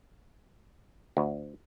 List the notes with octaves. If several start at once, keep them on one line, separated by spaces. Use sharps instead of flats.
D2